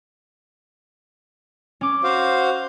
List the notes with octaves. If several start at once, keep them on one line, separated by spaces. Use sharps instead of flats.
C#4 D6
F#4 C5 F5